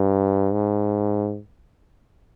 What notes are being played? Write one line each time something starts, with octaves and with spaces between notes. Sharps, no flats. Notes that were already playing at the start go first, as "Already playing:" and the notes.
Already playing: G2
G#2